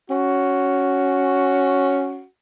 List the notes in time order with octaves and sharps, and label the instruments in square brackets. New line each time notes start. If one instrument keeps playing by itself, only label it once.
[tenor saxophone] C#4 [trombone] F#4